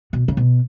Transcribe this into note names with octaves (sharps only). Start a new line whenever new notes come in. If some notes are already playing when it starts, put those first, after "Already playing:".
B2
C#3
B2